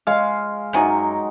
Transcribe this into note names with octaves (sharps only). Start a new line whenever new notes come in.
G#3 C#5 F5
F#2 F#3 D#4 G5 G#5